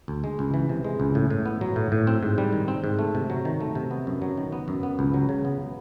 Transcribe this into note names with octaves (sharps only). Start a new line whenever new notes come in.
D2
G#3
C#2
E3
C3
G#3
C#2
A2
A2
B3
F#3
A2
A2
C4
G#2
G3
D#3
C4
G#2
A3
C3
F#3
D#3
A3
C3
B3
F#2
F#3
D#3
B3
F#2
B3
C#2
F#3
C#3
B3